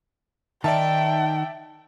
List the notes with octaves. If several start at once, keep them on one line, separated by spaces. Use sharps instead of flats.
D#3 D#4 D5 E5 G5 A5